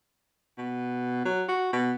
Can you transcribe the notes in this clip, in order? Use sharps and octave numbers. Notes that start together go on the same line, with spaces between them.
B2
F#3
F#4
B2